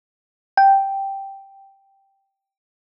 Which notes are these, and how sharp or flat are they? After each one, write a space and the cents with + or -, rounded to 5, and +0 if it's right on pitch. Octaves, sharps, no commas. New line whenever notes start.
G5 -5